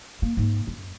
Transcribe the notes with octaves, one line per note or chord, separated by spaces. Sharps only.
A#3
G#2 A#3
F#2